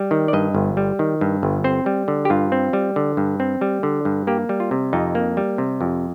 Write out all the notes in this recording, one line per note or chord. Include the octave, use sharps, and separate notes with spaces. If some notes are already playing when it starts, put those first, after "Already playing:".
Already playing: G3
D#3
D5
G2 D#5
G1
G3
D#3
G2
G1
C4 C5
G3
D3
G4
G2 F4
C4
G3
D3
G2
C4
G3
D3
G2
A#3 G4
G3
F4
C3
F2 D#4
A#3
G3
C3
F2